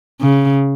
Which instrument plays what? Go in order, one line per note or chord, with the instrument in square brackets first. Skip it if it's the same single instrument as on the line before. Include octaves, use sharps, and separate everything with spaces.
[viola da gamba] C#3